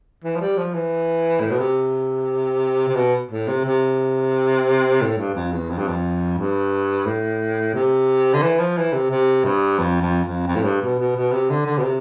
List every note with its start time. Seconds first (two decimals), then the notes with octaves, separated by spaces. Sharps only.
0.24 E3
0.36 F3
0.41 G3
0.58 F3
0.74 E3
1.40 A2
1.51 B2
1.60 C3
2.88 C3
2.96 B2
3.31 A2
3.48 C3
3.65 C3
5.01 A2
5.18 G2
5.35 F2
5.53 E2
5.70 F2
5.79 G2
5.88 F2
6.38 G2
7.06 A2
7.74 C3
8.34 D3
8.43 E3
8.59 F3
8.77 E3
8.93 C3
9.11 C3
9.44 G2
9.79 F2
10.02 F2
10.25 F2
10.47 F2
10.57 A2
10.65 G2
10.82 B2
10.99 B2
11.16 B2
11.32 C3
11.50 D3
11.66 D3
11.78 B2
11.83 C3